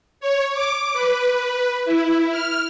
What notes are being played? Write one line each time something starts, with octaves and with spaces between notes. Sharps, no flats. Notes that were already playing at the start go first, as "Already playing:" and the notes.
C#5
D6
B4
E4
F6